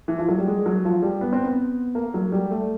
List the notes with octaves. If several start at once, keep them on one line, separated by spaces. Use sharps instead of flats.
E3
F3
F#3
G3
G#3
F#3
F3
G3
B3
C4
B3
A#3
F#3
G3
A3